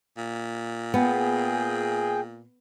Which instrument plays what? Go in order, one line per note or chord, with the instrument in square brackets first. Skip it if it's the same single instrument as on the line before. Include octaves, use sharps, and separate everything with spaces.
[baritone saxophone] A#2
[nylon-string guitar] B3 [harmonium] G#4 G5